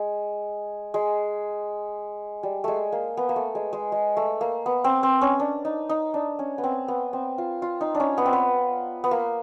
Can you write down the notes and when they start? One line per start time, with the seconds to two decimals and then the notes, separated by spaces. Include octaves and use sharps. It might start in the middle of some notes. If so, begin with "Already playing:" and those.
Already playing: G#3
0.94 G#3
2.43 G3
2.64 G#3 A3
2.92 A#3
3.17 B3
3.29 A#3
3.36 A3
3.55 G#3
3.73 G#3
3.92 G#3
4.17 A3
4.41 A#3
4.66 B3
4.84 C4
5.03 C4
5.21 C#4
5.40 D4
5.65 D#4
5.89 D#4
6.14 D4
6.39 C#4
6.58 B3
6.64 C4
6.88 B3
7.13 C4
7.38 F4
7.62 F4
7.81 D#4
7.95 D4
8.00 C#4
8.18 B3
8.26 C4
8.33 B3
9.04 B3
9.11 A#3